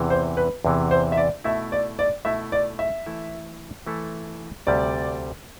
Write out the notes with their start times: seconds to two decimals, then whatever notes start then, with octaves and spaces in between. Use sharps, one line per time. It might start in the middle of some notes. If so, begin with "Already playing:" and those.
Already playing: E2 C3 E3
0.10 C5
0.37 B4
0.65 E2 C3 E3
0.91 C5
1.12 E5
1.17 D5
1.44 B2 A3 E4 E5
1.72 D5
1.99 D5
2.25 B2 A3 E4 E5
2.52 D5
2.79 E5
3.06 E3 A3 E4 A4
3.87 E3 A3 E4 A4
4.67 D2 C3 G3 D5